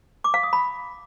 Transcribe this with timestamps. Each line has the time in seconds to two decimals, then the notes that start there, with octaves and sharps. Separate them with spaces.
0.24 D6
0.34 F5
0.43 D#6
0.53 B5